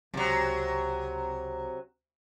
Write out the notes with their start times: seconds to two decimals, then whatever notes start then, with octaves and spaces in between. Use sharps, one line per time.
0.14 C#2 C3 F#3